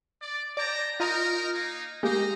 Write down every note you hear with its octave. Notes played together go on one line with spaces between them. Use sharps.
D5
D5 G5 A5 A#5
D#4 F4 A#4 D#5 A#5
A#3 D#4
G#3 A#3 D#4 G4 C5 A#5